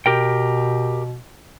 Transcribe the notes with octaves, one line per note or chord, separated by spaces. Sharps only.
B2 G4 A#4 G5